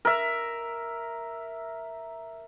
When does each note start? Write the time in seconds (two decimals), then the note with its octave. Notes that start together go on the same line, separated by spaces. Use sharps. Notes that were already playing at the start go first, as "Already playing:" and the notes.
0.05 A#4 E5